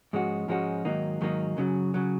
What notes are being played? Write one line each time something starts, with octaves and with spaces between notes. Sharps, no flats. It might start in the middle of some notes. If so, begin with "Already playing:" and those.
G#2 F3 G#3 C#4 F#4
G#2 F3 G#3 C#4 F#4
G#2 D#3 F#3 A#3 D#4
G#2 D#3 F#3 A#3 D#4
F#2 C#3 F#3
C#3 F#3